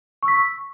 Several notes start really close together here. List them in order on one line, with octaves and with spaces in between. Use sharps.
C#6 E6 B6